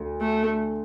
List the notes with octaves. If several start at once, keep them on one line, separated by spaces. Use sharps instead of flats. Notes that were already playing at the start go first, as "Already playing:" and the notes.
Already playing: D2
A3